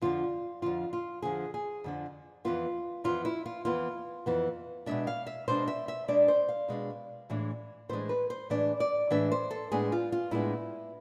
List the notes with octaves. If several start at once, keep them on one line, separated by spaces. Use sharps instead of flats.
F2 D3 F3 F4
F2 D3 F3 F4
F4
F2 D3 F3 G#4
G#4
F2 D3 F3
F2 E3 B3 F4
F2 E3 B3 F4
E4
F4
F2 E3 B3 F4
F2 E3 B3
B2 G#3 D4 E5
F5
E5
B2 G#3 D4 C5
E5
E5
B2 G#3 D4 D5
C5
F5
B2 G#3 D4
A2 E3 G#3 D4
A2 E3 G#3 D4 C5
B4
C5
A2 E3 G#3 D4 D5
D5
A2 E3 G#3 D4 E5
C5
A4
A2 G#3 B3 D4 G#4
F4
F4
A2 G#3 B3 D4 E4